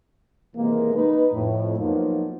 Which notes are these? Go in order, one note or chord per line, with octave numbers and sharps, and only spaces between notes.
D#2 C3 E3 G#3 A#3
D#4 B4
F2 A2
F3 F#3 A#3 B3 D#4